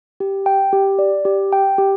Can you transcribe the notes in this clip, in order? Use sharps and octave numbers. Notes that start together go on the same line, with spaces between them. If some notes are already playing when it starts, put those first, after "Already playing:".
G4
G5
G4
D5
G4
G5
G4